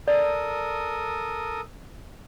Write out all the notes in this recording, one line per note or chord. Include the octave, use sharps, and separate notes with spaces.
A4 A#4 D5 D#6